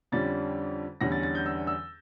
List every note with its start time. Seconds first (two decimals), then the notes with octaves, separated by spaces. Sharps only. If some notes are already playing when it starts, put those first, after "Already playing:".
0.12 F2 D3 G3 C#4 A6
1.01 E2 D3 G3 C#4 A#6
1.12 A6
1.23 A6
1.35 G6
1.46 E6
1.67 E6